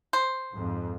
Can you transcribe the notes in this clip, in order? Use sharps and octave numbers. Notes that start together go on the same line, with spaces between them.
C5
F2 G#2